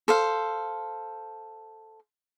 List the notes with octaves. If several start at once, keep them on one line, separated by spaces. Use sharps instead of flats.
A4 C5 F5